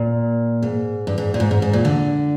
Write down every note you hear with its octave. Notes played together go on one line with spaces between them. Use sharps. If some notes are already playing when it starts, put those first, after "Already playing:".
Already playing: A#2
G#2
G2
G#2
A#2
G#2
G#2
G#2
A#2
D3